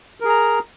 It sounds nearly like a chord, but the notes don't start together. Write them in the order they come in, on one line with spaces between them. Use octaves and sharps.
A#4 G#4 A#5